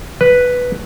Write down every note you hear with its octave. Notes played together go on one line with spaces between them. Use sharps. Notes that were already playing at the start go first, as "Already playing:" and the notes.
B4